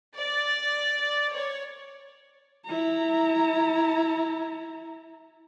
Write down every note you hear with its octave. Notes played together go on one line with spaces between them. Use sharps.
D5
C#5
E4 A#5